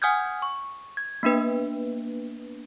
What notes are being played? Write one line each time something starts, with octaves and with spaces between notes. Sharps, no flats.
F#5 G#5 D#6 F6 G6 G#6
C#6
G#6
A#3 B3 D4 B4